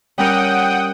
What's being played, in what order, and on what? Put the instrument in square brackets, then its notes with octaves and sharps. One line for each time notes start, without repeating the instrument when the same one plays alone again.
[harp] G3 C#4 A#4 [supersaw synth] F#5 G5 D#6